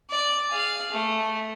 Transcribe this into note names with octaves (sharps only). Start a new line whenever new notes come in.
D5
G#4 F5
A3